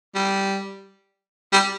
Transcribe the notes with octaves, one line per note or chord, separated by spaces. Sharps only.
G3
G3